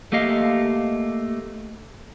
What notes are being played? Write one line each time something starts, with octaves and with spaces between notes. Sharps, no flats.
A3 A#3 G4 D#5 F5